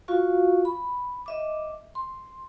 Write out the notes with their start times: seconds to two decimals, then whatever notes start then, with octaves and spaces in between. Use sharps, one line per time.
0.08 F4 F#4 F5 C#6
0.65 B5
1.26 D#5 E5 D6
1.95 C6